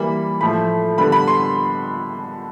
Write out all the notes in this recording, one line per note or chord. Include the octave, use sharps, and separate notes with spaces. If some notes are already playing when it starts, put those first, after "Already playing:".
Already playing: E3 G3 A#3 B5
A2 F3 A3 B5
D3 G3 B3 B5
B5
C6